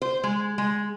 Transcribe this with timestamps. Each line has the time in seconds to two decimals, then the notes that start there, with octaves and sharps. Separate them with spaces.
0.02 C5
0.23 G#3
0.58 G#3